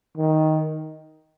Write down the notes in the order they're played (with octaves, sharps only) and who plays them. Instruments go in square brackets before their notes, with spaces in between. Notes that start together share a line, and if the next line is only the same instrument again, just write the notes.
[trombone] D#3